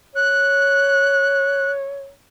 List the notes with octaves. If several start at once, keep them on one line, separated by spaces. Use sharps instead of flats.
C#5 F#6